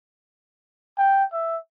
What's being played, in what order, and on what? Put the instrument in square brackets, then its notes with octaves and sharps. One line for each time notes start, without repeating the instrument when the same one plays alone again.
[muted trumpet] G5
E5